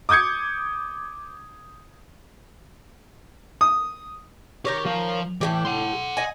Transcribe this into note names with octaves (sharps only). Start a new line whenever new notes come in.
D6 D#6 G6 G#6 C#7
D#6
D#3 G4 A#4 C#5
F3 F5
A2 C3 E3 G4
F#5 C6
D#5 G#5